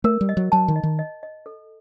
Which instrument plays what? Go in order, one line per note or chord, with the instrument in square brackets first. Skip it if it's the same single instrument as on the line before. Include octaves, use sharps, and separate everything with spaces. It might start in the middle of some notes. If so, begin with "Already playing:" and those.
[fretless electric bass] A3 [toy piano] A#4
[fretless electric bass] G3
[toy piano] D#5
[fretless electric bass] F#3
[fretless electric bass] F#3 [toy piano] A5
[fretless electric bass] D#3
[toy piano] D#5
[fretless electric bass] D#3
[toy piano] D#5
D#5
A4